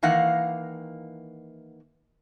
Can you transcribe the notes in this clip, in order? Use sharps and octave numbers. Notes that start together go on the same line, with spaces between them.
D#3 E3 A#3 F5 F#5